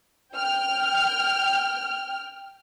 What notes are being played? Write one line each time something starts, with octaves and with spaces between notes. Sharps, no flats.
G5 F6